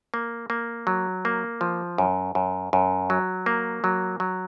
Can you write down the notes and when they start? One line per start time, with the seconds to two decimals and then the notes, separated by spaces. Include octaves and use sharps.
0.14 A#3
0.50 A#3
0.87 F#3
1.25 A#3
1.61 F3
1.98 F#2
2.35 F#2
2.73 F#2
3.10 F#3
3.46 A#3
3.84 F#3
4.20 F#3